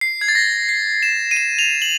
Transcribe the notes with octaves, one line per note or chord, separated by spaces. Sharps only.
C7
G#6
A6
A#6
C7
E7
D#7
E7
F7
F#7